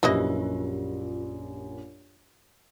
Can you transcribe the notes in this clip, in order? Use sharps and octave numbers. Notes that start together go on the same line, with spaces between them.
A#1 F#2 E3 E4 F4 G4 D#5